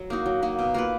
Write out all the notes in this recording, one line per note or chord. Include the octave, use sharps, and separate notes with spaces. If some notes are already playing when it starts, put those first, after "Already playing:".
Already playing: F#3
A#3 D#4 F#4
F#3
A#3 D#4 F#4
B2
A#3 F4 B4